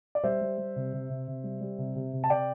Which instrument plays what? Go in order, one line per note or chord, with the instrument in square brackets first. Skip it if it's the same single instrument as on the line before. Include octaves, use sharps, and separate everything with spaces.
[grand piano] D5
G3 C5 E5
G3
G3
C3
C3
C3
C3
G3
G3
C3
C3
C3
A5
C3 D5 G5